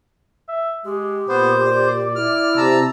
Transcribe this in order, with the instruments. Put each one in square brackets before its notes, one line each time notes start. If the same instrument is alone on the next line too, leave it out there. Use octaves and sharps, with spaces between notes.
[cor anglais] E5
[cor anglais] G#3 [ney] G4
[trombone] A#2 [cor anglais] B3 [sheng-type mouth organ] C5
[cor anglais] D5
[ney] E4 [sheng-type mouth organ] F6
[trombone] C3 [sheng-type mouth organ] A5 A#5 E6